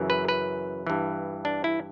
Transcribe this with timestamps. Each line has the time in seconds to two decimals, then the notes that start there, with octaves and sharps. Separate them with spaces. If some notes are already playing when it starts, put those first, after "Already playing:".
Already playing: F#2 C#3 E3
0.10 B4
0.28 B4
0.86 G2 E3
1.45 D4
1.64 E4